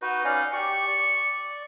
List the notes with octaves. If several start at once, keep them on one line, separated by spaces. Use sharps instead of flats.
D#4 F#4 B4
C#4 D#4 D5 F5
G4 D5 C#6
D5